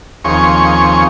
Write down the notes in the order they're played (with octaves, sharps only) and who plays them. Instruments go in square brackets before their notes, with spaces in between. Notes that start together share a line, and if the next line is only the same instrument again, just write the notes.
[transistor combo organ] D#2 F3 C4 G#4 C#5 C#6